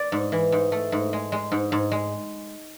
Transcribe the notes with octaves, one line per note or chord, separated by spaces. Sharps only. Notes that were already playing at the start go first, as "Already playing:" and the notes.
Already playing: D5
G#2
E3
G#2
A3
G#2
G#3
G#3
G#2
G#2
G#3